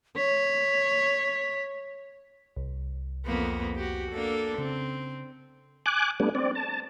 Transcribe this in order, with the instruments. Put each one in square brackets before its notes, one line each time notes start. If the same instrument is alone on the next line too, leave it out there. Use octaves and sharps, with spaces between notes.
[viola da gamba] C#5 [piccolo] B6
[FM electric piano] C2
[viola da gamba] F2 A#3 B3
F#4 G4
A#3 D4 A4
[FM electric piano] C#3 [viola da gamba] C4
[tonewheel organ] G#5 D6 F#6
G3 A3 B3 D4
C4 D5
A5